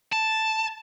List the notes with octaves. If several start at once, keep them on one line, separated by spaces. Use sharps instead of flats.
A5